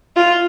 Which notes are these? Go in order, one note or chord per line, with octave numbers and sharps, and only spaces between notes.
F4